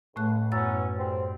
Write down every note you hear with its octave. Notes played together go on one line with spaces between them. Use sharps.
C#2 A2 A3 F#6
F#2 E3 B3 C#4 E6 A6
D2 G3 C4